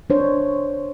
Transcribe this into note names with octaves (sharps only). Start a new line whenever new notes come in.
D4 C5 C#5